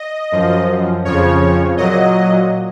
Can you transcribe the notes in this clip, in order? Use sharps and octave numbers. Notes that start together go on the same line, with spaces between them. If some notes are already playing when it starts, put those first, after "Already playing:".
Already playing: D#5
F#2 F3
F2 C#3 F3 C#5
A#2 F#3 D#5